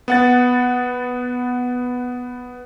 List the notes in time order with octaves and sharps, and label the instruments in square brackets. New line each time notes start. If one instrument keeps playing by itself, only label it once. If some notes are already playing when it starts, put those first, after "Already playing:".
[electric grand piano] B3 F#5 A6